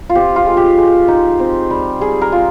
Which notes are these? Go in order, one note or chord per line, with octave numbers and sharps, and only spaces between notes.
F4
C4 G4
F4
G#3
G4
G#3
D#4
C4
G3
G3 G#4
A#4
F4